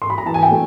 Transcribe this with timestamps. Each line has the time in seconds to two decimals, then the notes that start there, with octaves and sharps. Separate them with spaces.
0.02 C6
0.10 B5
0.18 A#5
0.26 E3 A5
0.34 G#5
0.43 G5
0.51 A3